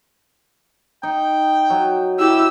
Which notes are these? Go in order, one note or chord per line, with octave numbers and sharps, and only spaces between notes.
D#4 G5
F#3
E4 G4 E6